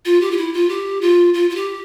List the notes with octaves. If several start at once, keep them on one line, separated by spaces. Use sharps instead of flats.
F4
G4
F4
E4
F4
G4
F4
F4
F4
G4